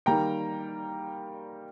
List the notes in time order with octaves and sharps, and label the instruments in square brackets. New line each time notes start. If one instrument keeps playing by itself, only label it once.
[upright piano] D#3 G3 A#3 G5 A#5